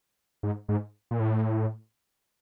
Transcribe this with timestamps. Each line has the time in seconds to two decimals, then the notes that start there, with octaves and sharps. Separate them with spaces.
0.43 G#2
0.69 G#2
1.11 A#2
1.20 A2